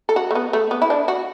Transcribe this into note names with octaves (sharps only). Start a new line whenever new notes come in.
A4
F#4
A3
B3
A3
B3
E4
D4
F#4